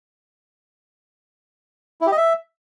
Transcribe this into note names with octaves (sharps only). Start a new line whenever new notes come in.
E4
G4
D#5
E5